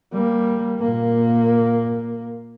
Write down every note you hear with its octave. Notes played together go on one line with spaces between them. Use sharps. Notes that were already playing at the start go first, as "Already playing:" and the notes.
G3 A#3
A#2 A#3